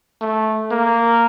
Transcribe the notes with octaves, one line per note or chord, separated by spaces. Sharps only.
A3
A#3